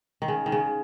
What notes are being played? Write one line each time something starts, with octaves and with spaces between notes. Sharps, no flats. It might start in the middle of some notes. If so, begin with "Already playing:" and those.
D#3
C#3
D#3
C#3